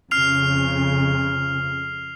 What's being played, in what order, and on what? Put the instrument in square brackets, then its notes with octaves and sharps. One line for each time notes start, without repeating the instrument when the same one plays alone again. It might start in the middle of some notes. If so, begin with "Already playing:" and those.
[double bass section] F2 C#3 [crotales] F6 C7 F7